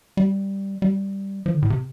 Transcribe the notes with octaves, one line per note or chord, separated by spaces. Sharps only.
G3
G3
F3
D3
A2
C3